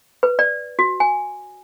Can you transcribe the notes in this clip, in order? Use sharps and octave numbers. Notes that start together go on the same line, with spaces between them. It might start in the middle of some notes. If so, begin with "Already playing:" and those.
B4
D5
F#4
G#5